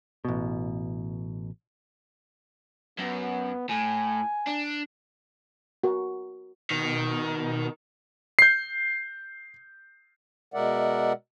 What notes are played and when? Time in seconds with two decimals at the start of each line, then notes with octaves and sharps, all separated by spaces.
0.25 A1 B2
2.99 F#2 B3
3.69 A2 G#5
4.47 D4
5.84 F#4 A#4 F#5
6.71 B2 D#3
8.39 G6 C7
10.54 B2 G#3 A#4 D5 E5 F#5